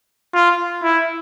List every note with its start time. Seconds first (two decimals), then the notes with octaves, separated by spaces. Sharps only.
0.35 F4
0.84 E4